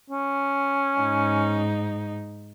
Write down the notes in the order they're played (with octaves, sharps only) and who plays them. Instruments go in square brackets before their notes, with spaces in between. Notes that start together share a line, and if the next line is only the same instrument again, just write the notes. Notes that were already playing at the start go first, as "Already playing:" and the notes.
[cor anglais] C#4
[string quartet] G#2 D#4